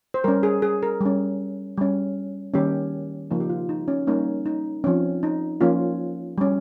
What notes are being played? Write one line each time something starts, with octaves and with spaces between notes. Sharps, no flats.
C5
G3 C#4 A#4
G#4
G#4
A#4
G3 C#4
G3 C#4
D#3 G3 A#3 C#4 G4
C#3 F3 A#3 D#4
G4
F4
D#4
C#4
G3 A#3 C#4 D#4
D#4
F3 C4 C#4
D#4
F3 A#3 C#4 F4
G3 C#4